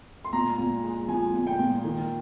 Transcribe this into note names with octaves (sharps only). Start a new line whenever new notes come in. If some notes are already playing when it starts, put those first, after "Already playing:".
C6
A#2 A#5
A#2
G#3
F3 G#5
A#2
G5
A#2
D#3